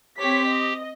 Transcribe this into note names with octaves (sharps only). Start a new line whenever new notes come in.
C4 G4 C#5 B6
D#5